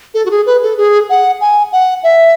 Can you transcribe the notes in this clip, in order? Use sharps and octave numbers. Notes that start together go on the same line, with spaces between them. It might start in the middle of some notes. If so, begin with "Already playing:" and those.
A4
F#4
G#4
B4
A4
G#4
F#5
G#5
F#5
E5